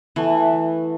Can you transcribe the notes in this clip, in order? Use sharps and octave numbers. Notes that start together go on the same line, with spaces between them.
E3 A3 B3